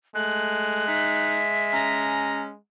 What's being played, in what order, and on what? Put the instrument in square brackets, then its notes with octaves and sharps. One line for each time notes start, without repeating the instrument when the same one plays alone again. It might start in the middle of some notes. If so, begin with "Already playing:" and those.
[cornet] G#3 [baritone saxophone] A3 [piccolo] F#6
[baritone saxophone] D#4 [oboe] E5
[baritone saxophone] C#4 [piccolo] A#5